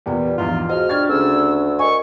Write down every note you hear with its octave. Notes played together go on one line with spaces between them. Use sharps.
E2 A#2 G3 B3
A#1 E2 G#2 F4
F3 F4 F#4 G#4 D#5 F6
G3 D4 C#6 G#6 A6
D2 C#3 G#3 E6
A#4 D#5 G#5 C#6